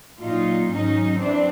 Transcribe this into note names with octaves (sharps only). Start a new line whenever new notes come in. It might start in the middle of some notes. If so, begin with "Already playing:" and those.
A#2 F#3 D#4 F4
G#2 D#3 F#3 C#4 D#4
G2 E3 C4 D4